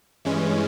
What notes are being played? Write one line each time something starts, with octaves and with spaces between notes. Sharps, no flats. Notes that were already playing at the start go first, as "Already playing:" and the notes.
G2 E3 G#3 C#4